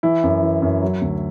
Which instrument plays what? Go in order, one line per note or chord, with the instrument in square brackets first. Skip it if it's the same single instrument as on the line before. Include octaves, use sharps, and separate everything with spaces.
[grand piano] E3 E4
F#2
E3
F#2
F#3
D2